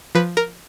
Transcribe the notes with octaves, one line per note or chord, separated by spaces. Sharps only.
F3 B4
A#4